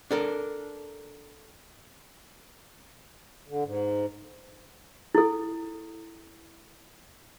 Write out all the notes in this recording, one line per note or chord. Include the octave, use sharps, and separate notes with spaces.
D4 A4 A#4
D3
G#2
E4 A4